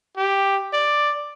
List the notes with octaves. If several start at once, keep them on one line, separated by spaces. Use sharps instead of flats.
G4
D5